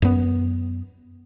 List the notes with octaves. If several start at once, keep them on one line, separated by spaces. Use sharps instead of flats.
F#2 B3